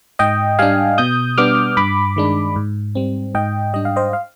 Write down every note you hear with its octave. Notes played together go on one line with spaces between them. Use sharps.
G#2 D#5 G5
G3 D4 F5 G#5
B2 D#6 G6
G3 B3 D4 D6 F6
G2 B5 D6
D#3 G#3 D4
G#2
G3 C4
G#2 D#5 G5
G3 D4 D#5
F5
C5 D#5
F5